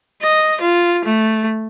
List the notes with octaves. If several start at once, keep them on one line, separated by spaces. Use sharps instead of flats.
D#5
F4
A3